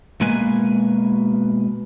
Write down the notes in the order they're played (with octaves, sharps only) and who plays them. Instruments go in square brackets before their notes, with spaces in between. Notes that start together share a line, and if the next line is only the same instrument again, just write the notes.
[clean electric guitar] B2 G#3 A#3 B4 G#5